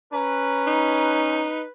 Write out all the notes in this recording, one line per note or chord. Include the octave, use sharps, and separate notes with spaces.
C#4 B4 A#5
D#4